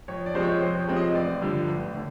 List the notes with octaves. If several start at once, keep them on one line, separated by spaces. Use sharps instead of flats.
F2 C#5
D5
C3 F3 G#3 C4 C5
C#5
F2 C5
C#5
C3 F3 G#3 C4
D#5
A1 D5
G2 D3 F3
A1
D3